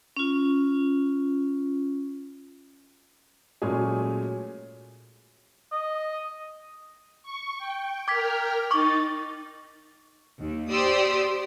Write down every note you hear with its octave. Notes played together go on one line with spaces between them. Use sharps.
C#4 F4
A#2 F#3 G#3 A3 C#4 G#4
D#5
C#6
G5
A#4 G5 D6 F6 G#6 B6
D#4 C#6 D6 A6
D#2
G4 C5 D5 C6 D#6 E6